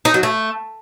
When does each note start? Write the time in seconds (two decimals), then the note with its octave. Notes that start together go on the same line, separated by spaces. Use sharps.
0.05 D#4
0.14 F#3
0.23 A3